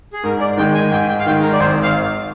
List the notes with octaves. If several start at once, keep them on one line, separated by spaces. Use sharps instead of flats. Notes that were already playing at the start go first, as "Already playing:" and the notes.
G#4
G#2 A#4
D5
D#3 G#3 G5
G#5
G#2 G5
G5
F5
D#3 G#3 G5
A#4
D5
G#1 C5
F5